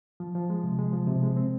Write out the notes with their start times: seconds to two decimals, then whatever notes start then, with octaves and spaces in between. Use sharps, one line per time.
0.20 F3
0.35 F3
0.50 G#3
0.64 C3
0.79 G#3
0.93 F3
1.07 C3
1.23 G#3
1.37 C4